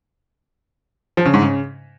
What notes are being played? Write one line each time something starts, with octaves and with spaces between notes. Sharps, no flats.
F3
C#3
G#2
C#3